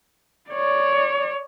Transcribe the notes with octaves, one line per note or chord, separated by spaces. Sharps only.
C#5 D5